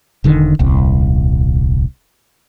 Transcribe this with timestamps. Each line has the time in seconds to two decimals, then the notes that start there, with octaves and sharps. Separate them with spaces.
0.24 E1 D3 D#3
0.59 D#1 C2